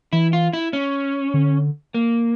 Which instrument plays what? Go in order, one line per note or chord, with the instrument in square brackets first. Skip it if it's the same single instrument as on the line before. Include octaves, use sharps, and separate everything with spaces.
[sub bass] E3 [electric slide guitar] E4
[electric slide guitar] F4
E4
C#4
[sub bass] D3
[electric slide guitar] A#3